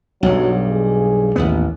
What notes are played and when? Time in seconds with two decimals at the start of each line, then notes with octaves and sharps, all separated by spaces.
0.23 B1 G2 F#3
0.70 G#4
1.36 A1 D#2 B3